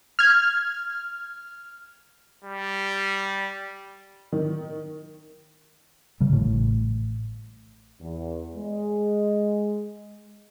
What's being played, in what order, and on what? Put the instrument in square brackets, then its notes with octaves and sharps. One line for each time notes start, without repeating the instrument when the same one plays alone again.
[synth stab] F6 G#6
[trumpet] G3
[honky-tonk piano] D#3
[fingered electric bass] C#3 G3
A1 A2
[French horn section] E2
G#3